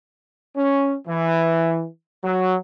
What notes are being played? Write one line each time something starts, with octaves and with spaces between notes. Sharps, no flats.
C#4
E3
F#3